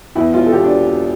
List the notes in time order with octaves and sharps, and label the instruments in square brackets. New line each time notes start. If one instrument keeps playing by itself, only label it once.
[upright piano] E2 E4
E1 F4
A4
E2 G4
D4